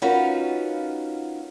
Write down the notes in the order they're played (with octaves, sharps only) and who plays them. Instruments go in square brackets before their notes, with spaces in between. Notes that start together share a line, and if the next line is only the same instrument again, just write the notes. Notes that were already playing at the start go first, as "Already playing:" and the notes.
[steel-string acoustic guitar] C#4 D#4 F4 F#4 A#4 B4